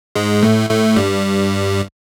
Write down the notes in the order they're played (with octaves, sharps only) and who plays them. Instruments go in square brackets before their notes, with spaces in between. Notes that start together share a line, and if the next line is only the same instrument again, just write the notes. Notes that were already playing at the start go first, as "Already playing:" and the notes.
[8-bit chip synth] G#2 G#3
A2 A3
A2 A3
G2 G3